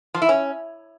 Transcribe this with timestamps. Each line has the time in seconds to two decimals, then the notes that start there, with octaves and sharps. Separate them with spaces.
0.14 F3
0.22 E4
0.29 C#4